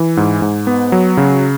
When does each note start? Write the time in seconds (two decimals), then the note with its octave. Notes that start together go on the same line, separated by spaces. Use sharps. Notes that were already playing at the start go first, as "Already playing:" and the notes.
Already playing: E3
0.17 G#2
0.42 G#2
0.67 B3
0.92 F#3
1.17 C#3